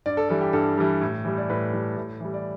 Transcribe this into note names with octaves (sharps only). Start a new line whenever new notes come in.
G2 D5
A4
E3 G3 A4
G4
G2 A4
E3 G3
A2
E3 G3
D5
A2 B4
E3 G3
A2
E3 G3
D5